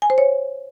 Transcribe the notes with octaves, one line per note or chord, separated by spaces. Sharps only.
G#5
C5
C#5